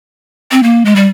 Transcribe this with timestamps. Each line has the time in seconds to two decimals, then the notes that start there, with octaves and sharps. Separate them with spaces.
0.52 C4
0.63 A#3
0.85 G#3
0.96 G3